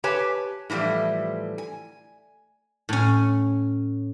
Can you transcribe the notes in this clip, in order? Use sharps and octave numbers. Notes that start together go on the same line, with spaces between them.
G4 B4 C#5 G#5 A5
A2 E3 F3 G3 A3
G#5
A2 C#4